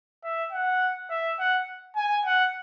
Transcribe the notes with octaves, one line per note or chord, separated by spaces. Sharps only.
E5
F#5
E5
F#5
G#5
F#5